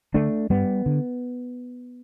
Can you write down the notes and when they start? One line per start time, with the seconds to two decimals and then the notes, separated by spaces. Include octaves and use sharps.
0.14 D3 A3 D4
0.50 G2 G3 B3
0.86 D3